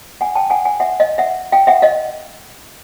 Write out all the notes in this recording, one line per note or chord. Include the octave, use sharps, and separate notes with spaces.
F#5 G#5
G5 A5
F#5 G#5
F#5 G#5
E5 F#5
D#5 F5
E5 F#5
F5 G5
E5 F#5
D#5 F5